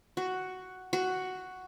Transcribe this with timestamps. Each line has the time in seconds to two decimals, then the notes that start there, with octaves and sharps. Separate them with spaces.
0.17 F#4
0.93 F#4